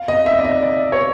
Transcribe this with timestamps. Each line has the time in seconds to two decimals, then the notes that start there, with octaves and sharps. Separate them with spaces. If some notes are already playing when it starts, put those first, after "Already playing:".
Already playing: F5
0.08 D#5
0.26 E5
0.38 D5
0.44 D#5
0.62 D5
0.92 C#5